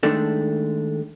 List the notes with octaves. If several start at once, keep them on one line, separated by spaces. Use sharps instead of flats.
D#3 G#3 A3 D4